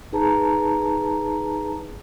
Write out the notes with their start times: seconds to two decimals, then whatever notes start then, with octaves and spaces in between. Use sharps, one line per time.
0.13 D#4 G#4 B4 A5 A#5